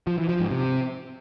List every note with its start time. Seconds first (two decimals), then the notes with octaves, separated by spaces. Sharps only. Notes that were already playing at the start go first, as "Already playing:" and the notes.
0.07 F3
0.18 E3
0.29 F3
0.40 G#2
0.51 C3